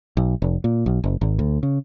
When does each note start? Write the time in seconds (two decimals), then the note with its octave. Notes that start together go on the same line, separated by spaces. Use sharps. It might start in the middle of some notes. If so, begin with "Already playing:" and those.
0.17 B1
0.42 F1
0.64 A#2
0.86 B1
1.04 F#1
1.21 G#1
1.39 D2
1.63 C#3